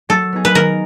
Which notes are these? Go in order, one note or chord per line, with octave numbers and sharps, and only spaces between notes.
F#3 A4
B3 D#4 G#4
B4
D#3 A#4